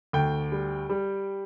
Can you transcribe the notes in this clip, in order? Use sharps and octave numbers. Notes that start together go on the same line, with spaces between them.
D2 G5
G3
G3